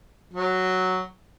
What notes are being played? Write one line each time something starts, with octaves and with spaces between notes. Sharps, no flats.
F#3